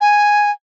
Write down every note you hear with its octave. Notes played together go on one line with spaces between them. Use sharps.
G#5